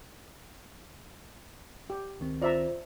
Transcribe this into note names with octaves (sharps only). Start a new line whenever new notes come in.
G4
C#2 D#3 C4
F4 C5 D5 E5 A#5